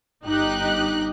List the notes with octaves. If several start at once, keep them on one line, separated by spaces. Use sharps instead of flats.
G1 G2 D#4 G4 F#6